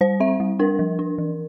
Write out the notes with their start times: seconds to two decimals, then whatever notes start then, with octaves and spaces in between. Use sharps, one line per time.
0.01 G3 C5
0.20 C4 E5
0.40 G3
0.59 D4 A#4
0.79 F3
0.99 D4
1.18 E3